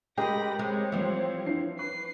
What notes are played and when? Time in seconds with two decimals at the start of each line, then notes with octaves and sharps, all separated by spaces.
0.18 G#3 G4 G#4 A#4 B5 A#6
0.59 G#3 C4 C#5
0.92 E3 F3 G3 A3
1.46 D4 E4 C7
1.79 B4 C#6 C7